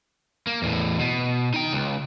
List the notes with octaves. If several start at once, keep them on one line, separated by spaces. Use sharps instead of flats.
A#3
E2 A2
B2
D#4 G5
C#2